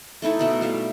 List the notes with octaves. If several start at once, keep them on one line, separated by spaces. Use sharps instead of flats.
A3 D#4 E4 A4
B2 A3 A4
G3 A3 F5